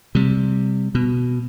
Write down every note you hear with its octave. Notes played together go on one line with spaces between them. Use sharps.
C3 G3
B2